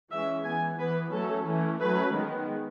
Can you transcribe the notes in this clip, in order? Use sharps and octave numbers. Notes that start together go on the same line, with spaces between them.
E3 G#3 C#4 E5
E3 B3 G#5
E3 B3 B4
F#3 A3 C#4 A4
E3 A3 C#4
F#3 A3 C#4 B4
D#3 G#3 B3